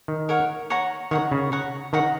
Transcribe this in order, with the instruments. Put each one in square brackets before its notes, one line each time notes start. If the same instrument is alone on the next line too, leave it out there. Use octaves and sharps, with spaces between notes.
[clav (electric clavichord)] D#3
[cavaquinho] A#4 C#5 F#5
C#5 F#5 A#5
[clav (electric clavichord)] D#3 [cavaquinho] C#5 F#5 A#5
[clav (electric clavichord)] C#3
[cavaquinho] C#5 F#5 A#5
[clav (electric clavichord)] D#3 [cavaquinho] C#5 F#5 A#5